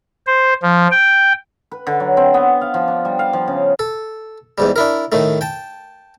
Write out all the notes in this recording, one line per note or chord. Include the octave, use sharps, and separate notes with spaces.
C5
F3
G5
B4
D3
F#3
C4
B3
F5
F3
D4
G3
F5
F3
C#3
A4
E2 G#2 G3
D4 E4 A#4
A2 D#3 A3
G5 A5